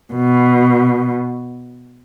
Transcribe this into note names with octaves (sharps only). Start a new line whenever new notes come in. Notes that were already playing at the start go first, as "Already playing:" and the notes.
B2